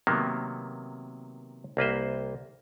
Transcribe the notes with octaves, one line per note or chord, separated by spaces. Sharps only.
C3 D#3 F#3 A#3 B3
C2 A#3 B4 C5